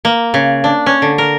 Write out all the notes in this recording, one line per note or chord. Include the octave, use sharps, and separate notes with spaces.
A#3
C#3
D4
C#4
D3
A#4